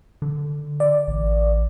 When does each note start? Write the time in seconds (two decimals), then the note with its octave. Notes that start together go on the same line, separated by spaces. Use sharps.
0.22 D3
0.80 D5
1.08 A1